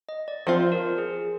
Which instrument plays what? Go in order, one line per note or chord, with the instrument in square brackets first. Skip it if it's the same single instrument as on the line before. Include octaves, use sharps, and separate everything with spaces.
[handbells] D#5
D5
[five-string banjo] F3 C4 F4 [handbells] C5
[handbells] A#4
G#4